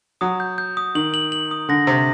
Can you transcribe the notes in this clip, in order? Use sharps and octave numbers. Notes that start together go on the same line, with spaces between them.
F#3 D#6
G6
G6
D#6
D#3 F#7
F#7
F#7
D#6
D3 A#6
C3 A#6